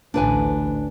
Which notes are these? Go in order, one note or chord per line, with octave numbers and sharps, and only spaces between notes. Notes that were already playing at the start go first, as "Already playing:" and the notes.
A1 D2 D4 B4 G#5